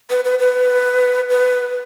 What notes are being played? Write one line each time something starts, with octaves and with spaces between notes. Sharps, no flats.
B4
B4
B4
B4